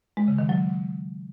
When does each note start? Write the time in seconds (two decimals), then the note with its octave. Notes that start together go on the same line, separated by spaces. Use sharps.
0.17 G#3
0.28 C#3
0.38 D#3
0.49 F#3